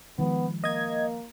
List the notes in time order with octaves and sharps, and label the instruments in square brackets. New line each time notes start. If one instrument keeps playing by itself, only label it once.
[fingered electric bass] D#3 F3 G#3 [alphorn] B3
[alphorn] A#3 [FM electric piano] D#5 G#6